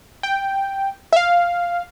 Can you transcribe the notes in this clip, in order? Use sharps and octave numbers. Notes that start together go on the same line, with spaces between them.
G5
E5
F5